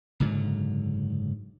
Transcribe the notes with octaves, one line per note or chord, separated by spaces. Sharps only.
F#1 G#2 D3 F#3